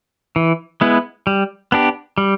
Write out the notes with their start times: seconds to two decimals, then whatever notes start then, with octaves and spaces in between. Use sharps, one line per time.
0.36 E3
0.81 G#3 B3 E4
1.27 G3
1.72 B3 D4 G4
2.18 G3